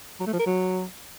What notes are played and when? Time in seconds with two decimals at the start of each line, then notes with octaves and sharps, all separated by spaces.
0.20 F#3
0.27 A3
0.33 F3
0.40 A#4
0.46 F#3